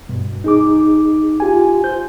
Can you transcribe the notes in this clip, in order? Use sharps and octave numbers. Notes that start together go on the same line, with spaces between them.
G2 B2
D#4 G#4 D6
F4 G4 G#5
C5 G6